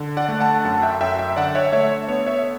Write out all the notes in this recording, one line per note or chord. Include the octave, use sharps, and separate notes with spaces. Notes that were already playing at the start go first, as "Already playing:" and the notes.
Already playing: D3
D5 F#5
A3
F#5 A5
F#2 F#5 A5
E5 G5
F#2 E5 G5
E5 G5
D3 D5 F#5
C#5 E5
A3 C#5 E5
B3 C#5
C#5 E5